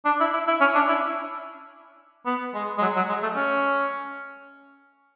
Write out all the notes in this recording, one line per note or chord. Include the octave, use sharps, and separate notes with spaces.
D4
E4
E4
E4
C#4
D4
E4
B3
G#3
G#3
F#3
F#3
G#3
A3
C#4